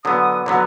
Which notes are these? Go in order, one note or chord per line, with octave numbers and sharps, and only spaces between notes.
D3 F#3 B3 D#6
D3 F#3 B3 A#5